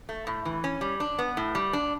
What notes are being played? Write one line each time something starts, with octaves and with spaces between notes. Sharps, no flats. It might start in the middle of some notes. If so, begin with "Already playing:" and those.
A3
A2
E3
C#4
G3
D4
B3
A2
G3
D4